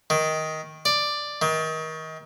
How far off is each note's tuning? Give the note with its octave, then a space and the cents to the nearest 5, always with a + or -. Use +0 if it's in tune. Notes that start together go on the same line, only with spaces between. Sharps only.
D#3 +10
D5 +5
D#3 +30